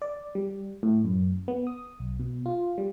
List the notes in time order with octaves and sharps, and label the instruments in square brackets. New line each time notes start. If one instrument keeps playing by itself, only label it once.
[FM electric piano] D5
G3
A2
F#2
B3
D#6
B1
B2
F4
G3